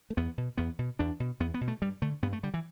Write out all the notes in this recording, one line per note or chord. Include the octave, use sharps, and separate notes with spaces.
A3
E2 B3
B2
E2 B3
B2
E2 D4
B2
E2 B3
B3
B2
A3
G2 G3
D3 A3
G2 B3
A3
D3 G3
E3